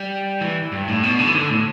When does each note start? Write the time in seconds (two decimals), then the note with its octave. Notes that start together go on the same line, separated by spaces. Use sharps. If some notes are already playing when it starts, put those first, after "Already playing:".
Already playing: G3
0.41 E3
0.72 G2
0.88 A2
1.03 B2
1.19 D3
1.27 E3
1.34 D3
1.50 A2